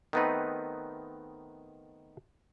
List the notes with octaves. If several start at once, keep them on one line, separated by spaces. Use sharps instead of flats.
D#3 A3 B3 C4 D#4 B4